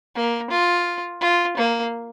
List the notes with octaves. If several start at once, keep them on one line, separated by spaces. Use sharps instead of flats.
A#3
F4
F4
A#3